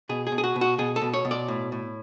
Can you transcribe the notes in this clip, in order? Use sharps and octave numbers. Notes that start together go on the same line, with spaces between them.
B2 G#4
G#4
B2
G#4
F#4
B2
F#4
B2 G#4
A4
B2
C#5
B2
D5
A2
A2